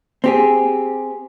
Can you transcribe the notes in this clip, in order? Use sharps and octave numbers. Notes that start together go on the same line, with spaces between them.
C4 G4 G#4